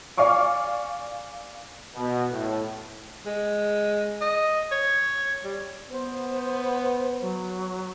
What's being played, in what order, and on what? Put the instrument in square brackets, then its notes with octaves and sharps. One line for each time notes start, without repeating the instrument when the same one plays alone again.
[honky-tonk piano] D5 F5 G#5 C#6 D6
[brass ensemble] B2
A2
[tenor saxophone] G#3
D#5
C#5
G3
[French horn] B3 [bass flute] C5
[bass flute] F#3